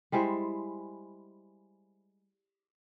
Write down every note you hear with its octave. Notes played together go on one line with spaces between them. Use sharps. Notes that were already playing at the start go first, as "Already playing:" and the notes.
G3 G#3 E4 C5